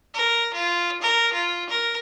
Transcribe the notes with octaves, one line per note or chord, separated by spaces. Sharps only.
A#4
F4
A#4
F4
A#4